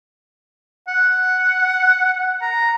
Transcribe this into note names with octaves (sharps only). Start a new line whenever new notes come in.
F#5
A#5